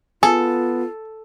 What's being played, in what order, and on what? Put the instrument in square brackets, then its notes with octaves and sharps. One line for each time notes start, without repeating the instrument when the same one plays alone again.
[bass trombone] B3 [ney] F4 [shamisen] G#4 [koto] A4